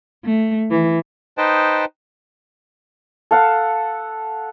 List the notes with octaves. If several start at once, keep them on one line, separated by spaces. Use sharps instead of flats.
A3
E3
D#4 B4 C5 D#5 G5 A5
A4 F5 F#5